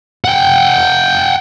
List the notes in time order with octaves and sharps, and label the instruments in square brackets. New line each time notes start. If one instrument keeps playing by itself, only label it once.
[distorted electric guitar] F#5 G5